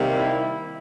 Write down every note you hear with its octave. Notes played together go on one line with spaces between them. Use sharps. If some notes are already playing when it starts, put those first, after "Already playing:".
Already playing: C3 D#3 G3 A#3
E4